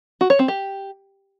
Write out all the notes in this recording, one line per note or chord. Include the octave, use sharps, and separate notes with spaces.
F#4
C#5
C4
G4